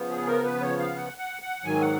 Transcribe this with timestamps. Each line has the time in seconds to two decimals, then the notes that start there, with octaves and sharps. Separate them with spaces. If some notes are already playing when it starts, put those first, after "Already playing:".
Already playing: C#3 F3 B3
0.10 G#4
0.26 A#4
0.44 B4
0.61 C#5
0.79 F5
0.95 F#5
1.18 F#5
1.42 F#5
1.64 G#2 D#3 F#3 G#5
1.81 F#5